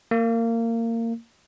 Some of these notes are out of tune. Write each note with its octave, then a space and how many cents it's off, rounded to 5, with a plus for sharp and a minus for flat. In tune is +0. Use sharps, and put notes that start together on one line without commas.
A#3 -25